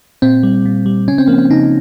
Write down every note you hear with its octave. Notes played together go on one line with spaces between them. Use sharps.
A#2 C4
G3
A#2
G3
C#3 C#4
C4
F3 A#3
C4
C#3 D#4